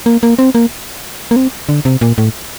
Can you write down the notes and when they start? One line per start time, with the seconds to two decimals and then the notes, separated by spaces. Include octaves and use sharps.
0.06 A#3
0.23 A#3
0.39 C4
0.55 A#3
1.31 A#3
1.36 C4
1.69 D3
1.85 C3
2.01 A#2
2.18 A2